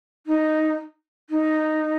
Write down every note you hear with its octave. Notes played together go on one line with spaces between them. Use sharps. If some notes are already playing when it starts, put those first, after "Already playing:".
D#4
D#4